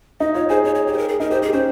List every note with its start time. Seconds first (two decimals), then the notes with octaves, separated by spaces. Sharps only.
0.20 D#4 D#5
0.34 F4 C#5
0.49 G#4 C5
0.64 G#4 C#5
0.75 C#5
0.87 G4 C#5
0.93 C5
0.98 A#4
1.09 G#4
1.20 D#4 A#4
1.31 G4 C5
1.42 G4 G#4
1.53 C#4 C5